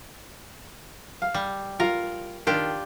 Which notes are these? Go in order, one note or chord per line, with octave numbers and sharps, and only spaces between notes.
F5
G3
F4 A#4 F5
D#3 D4 F4 G4